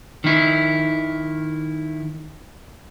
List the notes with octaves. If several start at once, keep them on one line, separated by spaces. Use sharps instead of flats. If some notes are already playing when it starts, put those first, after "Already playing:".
D#3 E4